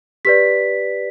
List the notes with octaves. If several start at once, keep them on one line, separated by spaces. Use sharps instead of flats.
G4 B4 D5 B6